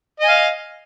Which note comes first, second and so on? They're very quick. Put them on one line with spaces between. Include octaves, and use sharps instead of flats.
D#5 G#5 F5